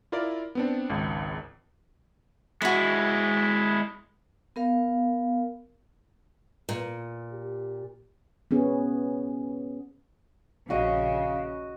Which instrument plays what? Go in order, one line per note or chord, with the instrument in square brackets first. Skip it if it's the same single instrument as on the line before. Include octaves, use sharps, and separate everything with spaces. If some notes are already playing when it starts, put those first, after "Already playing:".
[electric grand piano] E4 F4 A#4 D5
B3 C4 D4
G#1 C#2
[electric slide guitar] G#3 E4 [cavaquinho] F#4 C#5
[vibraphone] B3 A#4 F5
[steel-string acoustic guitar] A#2
[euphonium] G4
[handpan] B3 C#4 G#4
[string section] A#1 C#3 [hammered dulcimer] F#4 D#5 [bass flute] F5